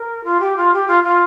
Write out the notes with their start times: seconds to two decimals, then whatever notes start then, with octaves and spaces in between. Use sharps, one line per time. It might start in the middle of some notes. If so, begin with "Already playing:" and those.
Already playing: A#4
0.24 F4
0.40 G4
0.56 F4
0.72 G4
0.87 F4
1.03 F4